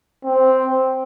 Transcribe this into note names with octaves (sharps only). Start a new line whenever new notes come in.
C4